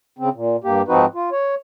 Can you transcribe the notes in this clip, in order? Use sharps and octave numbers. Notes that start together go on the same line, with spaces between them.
C#3 C4
A#2
G2 A#3 G4
G#2 F3 C4 D#4 F#4 B4
F4
C#5